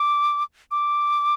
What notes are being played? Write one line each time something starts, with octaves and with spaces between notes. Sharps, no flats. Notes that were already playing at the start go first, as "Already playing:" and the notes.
Already playing: D6
D6